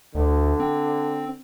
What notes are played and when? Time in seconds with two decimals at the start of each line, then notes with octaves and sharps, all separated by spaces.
0.15 D2 D3
0.60 C4